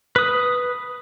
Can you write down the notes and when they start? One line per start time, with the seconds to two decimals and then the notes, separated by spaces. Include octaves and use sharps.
0.16 B4 D#6